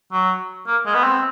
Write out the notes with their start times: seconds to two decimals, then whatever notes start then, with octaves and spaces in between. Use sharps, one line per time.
0.12 F#3
0.67 A#3
0.86 G#3
0.94 B3
1.04 C4